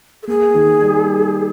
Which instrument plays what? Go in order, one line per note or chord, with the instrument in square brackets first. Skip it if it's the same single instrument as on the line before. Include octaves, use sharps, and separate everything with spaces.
[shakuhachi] A4
[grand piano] A#3 [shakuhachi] G#4
[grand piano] D#3
G3